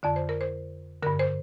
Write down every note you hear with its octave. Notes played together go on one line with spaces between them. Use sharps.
F2 D3 D5
C5
A#4
C5
G2 D3 A#4
C5